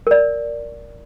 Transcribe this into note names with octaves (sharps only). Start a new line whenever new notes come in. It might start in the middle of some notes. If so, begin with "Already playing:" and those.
A#4 D5